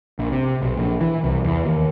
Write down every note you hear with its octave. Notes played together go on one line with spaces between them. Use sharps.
A#1
C3
B1
A#1
E3
C2
E2
D#2